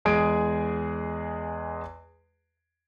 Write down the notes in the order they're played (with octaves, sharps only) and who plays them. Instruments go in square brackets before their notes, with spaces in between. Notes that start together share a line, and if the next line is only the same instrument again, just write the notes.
[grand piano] E2 G#3 G#4 D#6 G#6 D7